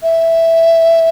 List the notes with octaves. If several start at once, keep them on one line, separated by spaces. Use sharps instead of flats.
E5